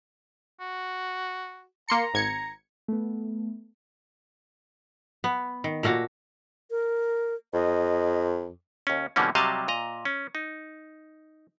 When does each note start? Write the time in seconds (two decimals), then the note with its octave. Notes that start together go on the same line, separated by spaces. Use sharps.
0.60 F#4
1.89 A#3 A#5 C6 C#7
2.14 G#1 G#6 C#7
2.88 A3 B3
5.24 B3
5.64 D#3
5.83 A#2 A3 A#3 F#4
6.71 A#4
7.54 F2 D#5
8.87 D#2 C#4
9.16 B2 D3 E3 G3 A#3 C#4
9.35 C3 F#3 G3 D#5 F5 A5
9.68 A#2 D#5 A#5
10.05 C#4
10.35 D#4